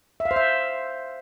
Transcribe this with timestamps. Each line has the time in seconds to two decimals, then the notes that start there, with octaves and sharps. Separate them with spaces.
0.20 E5
0.25 F5
0.31 C5
0.36 E5